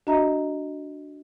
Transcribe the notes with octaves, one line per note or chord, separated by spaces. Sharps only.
D4 F#4 D#5 E5 A#5